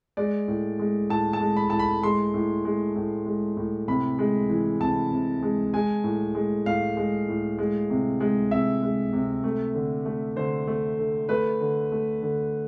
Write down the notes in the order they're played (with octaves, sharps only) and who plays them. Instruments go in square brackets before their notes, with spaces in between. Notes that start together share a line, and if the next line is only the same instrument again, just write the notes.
[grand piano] G#3 D5
A2
G#3
A2 A5
A5
G#3
B5
A2 A5
B5
G#3 C6
A2
G#3
A2
G#3
A2
C3 B5
G#3
E3
C3 A5
C3
G#3
G#3 G#5
A2
G#3
A2 F5
G#3
A2
G#3
C3
G#3
C3 E5
G#3
C3
A3
D3
A3
D3 C5
A3
D3
A3 B4
D3
A3
D3